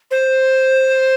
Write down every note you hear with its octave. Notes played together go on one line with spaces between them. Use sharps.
C5